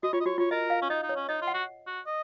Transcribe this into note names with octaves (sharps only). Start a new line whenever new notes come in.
F#4 D#5
F4 C#5
D#5
F#4 C#5
F4 C#5
A#4 D#5
F5
C#4
D#4 D#5
D#4
C#5
C#4
D#4 D#5
F4
F#5
F#4
F#4
D#5